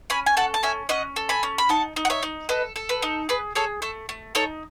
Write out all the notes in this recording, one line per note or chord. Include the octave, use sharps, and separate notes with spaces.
C#4 G#5 B5
G#5
A4 F#5 A5
A5
C#4 E5 G#5
C#4 D#5 F#5
A4
G#5 B5
C#4
B5
D#4 F#5 A5
D#4
F#5
C#5 E5
D#4
A4 B4 D#5
A4
B4
D#4
G#4 B4
G#4 A4 C#5
A3 A4
A3
D#4 A4 C#5